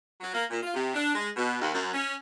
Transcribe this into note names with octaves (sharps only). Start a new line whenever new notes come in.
F#3
A#3
A#2
F4
C3
D4
G#3
B2
D#2
F#2
C#4